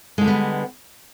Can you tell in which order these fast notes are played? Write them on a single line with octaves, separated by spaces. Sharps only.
G#3 D3 G3 B3